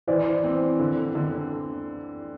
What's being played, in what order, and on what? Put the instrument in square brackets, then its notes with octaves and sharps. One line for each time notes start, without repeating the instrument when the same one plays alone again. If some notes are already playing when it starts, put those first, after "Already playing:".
[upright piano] E3 [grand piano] C5 D5
[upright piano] C4
D3
D3